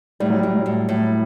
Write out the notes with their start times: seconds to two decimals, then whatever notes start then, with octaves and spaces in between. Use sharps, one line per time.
0.20 A2 G3
0.30 F#3
0.39 G3
0.43 A2
0.55 F#3
0.66 A2
0.89 A2